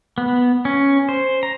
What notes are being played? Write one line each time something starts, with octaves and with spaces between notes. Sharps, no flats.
B3
C#4
C5
A#5